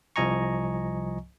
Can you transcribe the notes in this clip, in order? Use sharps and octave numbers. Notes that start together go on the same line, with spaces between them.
C2 F3 D#5 G#5 A#5 C#6